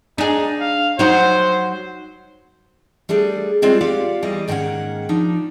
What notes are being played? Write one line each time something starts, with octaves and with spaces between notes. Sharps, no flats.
D4 D#4 G#4
F5
F#3 D#4 F#4 C5
G3 A3 D4 G#4
G3 G#3 C4 E4 F4 D5
F4 G4 D5 F5 F#5
E2 E3 G3 G#4 D#5
G#2 D#3 F#3 A#3 C#4 F#5
F3 D4 D#4